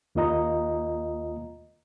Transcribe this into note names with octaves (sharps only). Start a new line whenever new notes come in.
D#2 A#3 F4 D#5 A#5